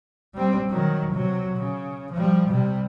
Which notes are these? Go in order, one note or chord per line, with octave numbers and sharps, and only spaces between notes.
G3 C4
D#3 F#3
C3 F#3
C#3
F3 G3
C3 G3